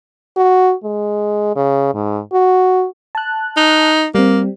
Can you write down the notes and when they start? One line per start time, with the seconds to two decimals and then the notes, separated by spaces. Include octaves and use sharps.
0.37 F#4
0.84 G#3
1.56 C#3
1.94 G#2
2.33 F#4
3.15 A5 F#6
3.57 D#4
4.15 G3 A#3 C4